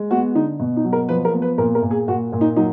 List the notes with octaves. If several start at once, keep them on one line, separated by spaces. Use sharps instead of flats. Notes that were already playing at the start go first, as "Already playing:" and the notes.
Already playing: G#3
B3 F#4
D3 D#4
B2
D#4
F#3
A#4
F3 B4
A#4
B3
B4
A#2 A#4
A#4
A#2
G#4
A#2 F#4
A#2
D#4
F#3 D#4